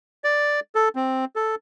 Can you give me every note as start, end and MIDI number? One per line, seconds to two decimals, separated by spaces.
0.24 0.60 74
0.75 0.89 69
0.96 1.25 60
1.36 1.55 69